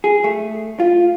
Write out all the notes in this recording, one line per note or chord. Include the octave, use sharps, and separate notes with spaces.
G#4
A3
F4